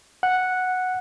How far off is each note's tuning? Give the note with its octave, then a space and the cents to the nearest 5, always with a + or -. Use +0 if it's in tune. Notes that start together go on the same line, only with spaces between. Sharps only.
F#5 -5